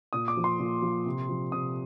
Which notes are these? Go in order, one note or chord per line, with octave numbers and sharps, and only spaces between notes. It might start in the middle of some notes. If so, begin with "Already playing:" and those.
A#2 D#6
D6
F3
C6
A#2
F3
C3
F3
C3 D#6